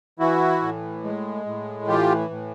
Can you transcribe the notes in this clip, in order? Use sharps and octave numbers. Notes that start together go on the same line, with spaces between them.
E3 E4 F#4
A2
G#3
A2
E3 F4 G4
A2